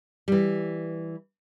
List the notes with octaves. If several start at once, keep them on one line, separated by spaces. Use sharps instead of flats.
E3 G3